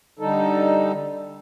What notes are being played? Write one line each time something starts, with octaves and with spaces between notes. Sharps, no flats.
D3 G3 D#4 A4